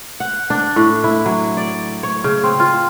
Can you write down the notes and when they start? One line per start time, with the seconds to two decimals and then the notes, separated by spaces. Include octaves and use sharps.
0.20 F#5
0.50 D4
0.76 A2
1.04 E4
1.26 F#3
1.57 D5
2.03 C#5
2.24 C#3
2.44 C4
2.60 F4